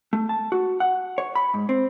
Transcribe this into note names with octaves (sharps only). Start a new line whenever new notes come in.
A3
A5
F#4
F#5
C#5
B5
G#2
C4